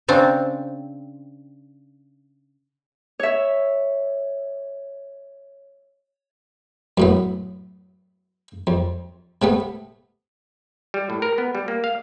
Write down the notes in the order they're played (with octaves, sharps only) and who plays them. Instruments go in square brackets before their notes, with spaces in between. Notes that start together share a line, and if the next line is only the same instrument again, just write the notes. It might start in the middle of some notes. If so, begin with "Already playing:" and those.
[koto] C#3 C4 D4
[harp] C#5 E5
[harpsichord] F#2 A2 B3
F2
C3 A3 B3
[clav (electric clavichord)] G3
A2
A#4
B3
G3
A#3
F5